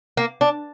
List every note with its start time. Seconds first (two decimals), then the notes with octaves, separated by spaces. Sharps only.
0.17 A#3
0.41 D4